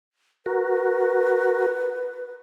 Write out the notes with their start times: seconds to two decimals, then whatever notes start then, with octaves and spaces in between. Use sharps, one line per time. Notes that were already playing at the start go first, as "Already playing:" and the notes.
0.46 F#4 A#4 B4